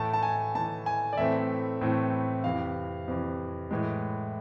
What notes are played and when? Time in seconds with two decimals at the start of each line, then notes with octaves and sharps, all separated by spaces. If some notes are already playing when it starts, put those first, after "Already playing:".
Already playing: A2 E3 A3 A5
0.13 A5
0.23 G#5
0.55 A2 E3 A3 A5
0.86 G#5
1.13 D5
1.17 A2 E3 A3 C4 E5
1.81 A2 E3 A3 C4
2.44 F2 C3 E3 F5
3.08 F2 C3 E3
3.71 A2 E3 G#3